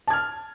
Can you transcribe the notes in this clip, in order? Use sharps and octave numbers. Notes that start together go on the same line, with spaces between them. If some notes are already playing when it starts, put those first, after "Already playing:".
A5 F6 G#6